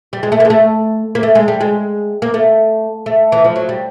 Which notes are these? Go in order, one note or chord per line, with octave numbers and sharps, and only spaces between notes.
G3
G#3
A3
A#3
G#3
A3
A#3
A3
G#3
G3
G#3
A#3
A3
A3
E3
F3
F#3
G3